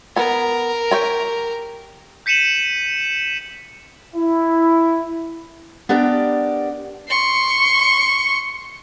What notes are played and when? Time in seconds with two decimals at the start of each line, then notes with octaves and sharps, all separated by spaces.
0.16 B3 A#4 G#5
0.91 G4 C#5 G#5
2.26 G6 B6 C#7 D#7 E7 F#7
4.15 E4
5.89 B3 D4 G4 A#4 D5 G5
7.09 C6 C#6